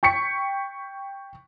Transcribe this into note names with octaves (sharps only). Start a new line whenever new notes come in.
G5 C#6 B6 C#7